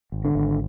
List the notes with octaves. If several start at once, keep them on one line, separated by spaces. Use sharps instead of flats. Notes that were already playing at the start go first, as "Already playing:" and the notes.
G#1
D3
G#1